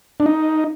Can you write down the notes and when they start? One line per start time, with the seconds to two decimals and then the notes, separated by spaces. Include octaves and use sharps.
0.20 D4
0.26 D#4